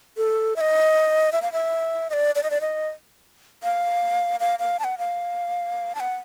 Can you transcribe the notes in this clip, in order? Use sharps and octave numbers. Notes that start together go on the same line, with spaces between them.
A4
E5
D#5
E5
F5
E5
D#5
D5
D5
D#5
D5
D#5
F5
F5
F5
A5
F#5
F5
A5
F#5